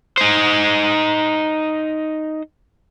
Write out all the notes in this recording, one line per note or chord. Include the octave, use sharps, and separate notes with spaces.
D#4 C5